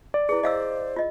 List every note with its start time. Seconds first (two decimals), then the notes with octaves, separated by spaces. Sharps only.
0.14 D5
0.29 E4 G#4 B4
0.43 C5 D#5 F5 E6
0.96 F4 D#5